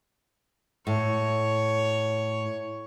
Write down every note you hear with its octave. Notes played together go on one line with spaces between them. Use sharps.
A2 C#5